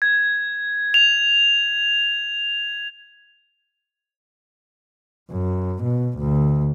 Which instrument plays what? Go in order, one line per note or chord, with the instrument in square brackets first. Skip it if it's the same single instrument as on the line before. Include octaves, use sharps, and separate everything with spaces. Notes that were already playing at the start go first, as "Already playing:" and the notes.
[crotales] G#6
F7
[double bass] F#2
B2
D2